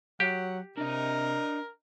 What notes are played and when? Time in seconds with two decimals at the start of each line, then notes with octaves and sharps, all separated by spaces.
0.20 F#3 G4 F#5
0.78 C3 D4 A#4 D#5